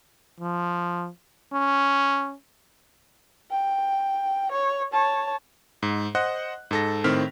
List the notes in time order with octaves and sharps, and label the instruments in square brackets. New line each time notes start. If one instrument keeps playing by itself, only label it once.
[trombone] F3
C#4
[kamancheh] G5
C#5
C#5 A5
[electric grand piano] G#2
C5 D#5 F#5 F#6
G#2 A4 A#6
A2 D#3 C4 F6 B6